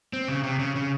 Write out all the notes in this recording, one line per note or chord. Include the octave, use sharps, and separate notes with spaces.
C4
C#3
C3
C#3
C#3